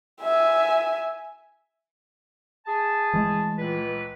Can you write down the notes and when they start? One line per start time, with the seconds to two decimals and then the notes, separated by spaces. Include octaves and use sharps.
0.21 E5 G#5
2.66 G#4 A5
3.14 E3 G#3 A3
3.57 C#2 A#2 B4